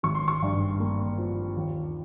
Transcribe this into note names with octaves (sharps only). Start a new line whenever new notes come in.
G#1 C#6
C6
C#6
G2
A#3
F3
D#2